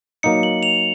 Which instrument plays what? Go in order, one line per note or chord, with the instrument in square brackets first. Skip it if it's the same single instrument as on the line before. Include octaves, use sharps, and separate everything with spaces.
[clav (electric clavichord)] F#3 A#3 D#4 [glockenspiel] C#7
[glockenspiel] F#7
F7